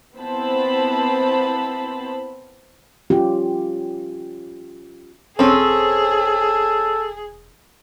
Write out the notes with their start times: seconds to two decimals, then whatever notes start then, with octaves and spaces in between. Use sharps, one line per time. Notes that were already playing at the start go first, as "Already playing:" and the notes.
0.16 B3 C4 E4 C5 A5 B5
3.10 C#4 F4 G4
5.39 E1 C4 C#4 G#4 A4